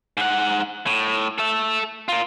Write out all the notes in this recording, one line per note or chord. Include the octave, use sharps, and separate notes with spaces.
G#2 F#5
A2
A4 E5
F4 A#4